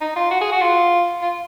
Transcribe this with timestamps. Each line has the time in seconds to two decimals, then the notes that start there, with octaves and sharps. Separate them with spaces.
0.01 D#4
0.16 F4
0.30 F#4
0.41 G#4
0.52 F#4
0.61 F4
1.22 F4